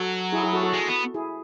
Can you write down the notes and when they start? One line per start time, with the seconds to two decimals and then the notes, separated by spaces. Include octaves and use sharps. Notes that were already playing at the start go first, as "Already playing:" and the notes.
Already playing: F#3 F#4 A4
0.32 E4 G#4
0.43 E4 G#4
0.53 F#4 A4
0.63 F#4 A4
0.73 G#3
0.88 B3
1.14 E4 G#4